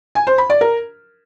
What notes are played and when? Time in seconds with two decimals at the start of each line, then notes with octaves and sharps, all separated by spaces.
0.15 G#5
0.27 C5
0.38 B5
0.50 D5
0.61 A#4